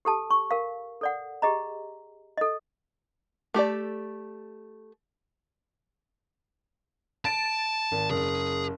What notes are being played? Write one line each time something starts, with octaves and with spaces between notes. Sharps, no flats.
G4 A4 A5
C#6
A#4 F5
A4 D5 F#5
G4 G#4 D#5 A#5
A4 D#5
A3 G4 A4 D5
A5 A6 D7
G#1
F#1 G#4